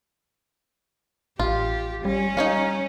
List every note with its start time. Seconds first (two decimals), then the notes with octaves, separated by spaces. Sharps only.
1.39 A1 F4 G4
2.05 G3 C#4
2.37 G3 D#4 C#5 F5